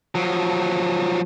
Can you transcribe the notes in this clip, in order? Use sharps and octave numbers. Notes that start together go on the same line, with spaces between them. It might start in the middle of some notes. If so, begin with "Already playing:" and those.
F3 F#3